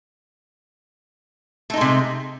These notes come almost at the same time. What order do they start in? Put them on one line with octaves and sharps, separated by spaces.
A3 D#4 G#3 C3